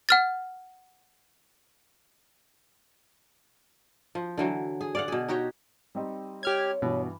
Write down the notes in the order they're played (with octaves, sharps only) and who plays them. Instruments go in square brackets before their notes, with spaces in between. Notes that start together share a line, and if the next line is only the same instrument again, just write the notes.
[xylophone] F#5 F6 A6
[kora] F3
D3 E3 F#3
G#4
D5 F5 F#5
B2 G#4
D#4 F#4 G4 C#5
[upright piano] G3 C4 D#4
[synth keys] G4 F6 G#6 [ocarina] C#5
[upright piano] G2 E3 [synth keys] B2